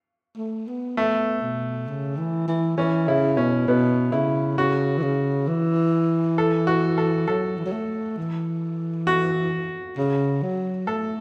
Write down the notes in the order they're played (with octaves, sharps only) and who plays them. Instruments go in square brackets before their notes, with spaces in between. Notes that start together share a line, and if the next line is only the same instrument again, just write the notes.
[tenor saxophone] A3
B3
[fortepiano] A3 [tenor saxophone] B3
[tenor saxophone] B2
C#3
E3
E3
[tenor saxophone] E3 [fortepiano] C#4
[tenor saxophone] C#3 [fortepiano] E4
[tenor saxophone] B2 [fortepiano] C#4
[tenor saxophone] B2 [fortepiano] B3
[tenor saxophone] C#3 [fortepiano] E4
[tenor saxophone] C#3 [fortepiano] F#4
[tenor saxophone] E3
C#3
E3
[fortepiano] A4
F#4
A4
[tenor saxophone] F#3 [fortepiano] A4
[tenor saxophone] E3
F#3
A3
E3
[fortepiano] F#4
[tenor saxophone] C#3
F#3
[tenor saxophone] A3 [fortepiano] A4